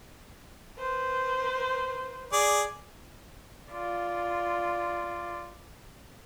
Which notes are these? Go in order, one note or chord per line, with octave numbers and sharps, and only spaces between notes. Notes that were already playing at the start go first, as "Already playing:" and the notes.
B4 C5
G#4 D5
F4 D5